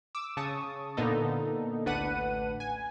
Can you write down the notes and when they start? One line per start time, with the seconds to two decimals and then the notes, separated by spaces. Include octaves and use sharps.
0.15 D6 E6
0.37 C#3 A5 C#6 D#6
0.97 A#2 D3 B3 D#4 A4
1.85 A1 D2 D4 B4 F#5 D#7
2.60 G#5